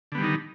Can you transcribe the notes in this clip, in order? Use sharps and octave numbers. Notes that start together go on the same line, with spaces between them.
D3 D#3 G3 B3 D#4